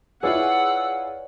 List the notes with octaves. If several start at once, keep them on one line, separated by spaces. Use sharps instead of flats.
E4 F4 G#4 B4 C#5 D5 F#5 E6